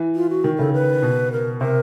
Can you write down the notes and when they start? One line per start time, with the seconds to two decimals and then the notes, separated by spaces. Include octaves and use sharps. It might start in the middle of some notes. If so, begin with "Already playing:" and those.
Already playing: E3
0.15 F4
0.30 F#4
0.44 D#3
0.58 C#3 A4
0.73 B4
1.02 B2
1.32 A#4
1.61 C3 A#4